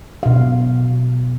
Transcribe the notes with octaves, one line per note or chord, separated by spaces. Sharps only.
B2 F5